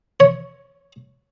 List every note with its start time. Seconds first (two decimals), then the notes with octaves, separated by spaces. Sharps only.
0.20 C#5